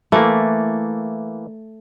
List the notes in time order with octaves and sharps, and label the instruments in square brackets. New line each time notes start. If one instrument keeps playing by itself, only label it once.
[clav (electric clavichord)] E3 A#3 [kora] A3